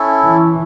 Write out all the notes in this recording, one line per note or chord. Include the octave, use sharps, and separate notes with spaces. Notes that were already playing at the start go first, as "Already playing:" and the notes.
Already playing: C#4 E4 A4
E3